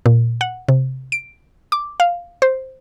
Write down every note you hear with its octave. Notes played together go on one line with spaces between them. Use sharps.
A#2
F#5
C3
D7
D6
F5
C5